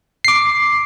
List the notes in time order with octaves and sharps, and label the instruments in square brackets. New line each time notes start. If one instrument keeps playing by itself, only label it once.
[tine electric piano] D6 C7